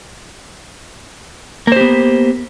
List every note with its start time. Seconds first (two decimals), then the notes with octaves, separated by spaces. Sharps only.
1.67 A#3
1.72 C5
1.76 G4
1.81 B3